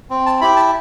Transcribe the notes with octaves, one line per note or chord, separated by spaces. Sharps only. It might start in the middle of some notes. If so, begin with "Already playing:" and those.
C4
A5
E4 G4 B5
A5